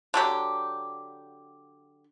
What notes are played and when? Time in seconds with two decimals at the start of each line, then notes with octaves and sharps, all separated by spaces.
0.14 D3 F#3 G4